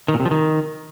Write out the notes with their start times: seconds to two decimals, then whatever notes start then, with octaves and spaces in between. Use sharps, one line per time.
0.08 D#3
0.14 A#2
0.20 C3
0.25 F3
0.31 D#3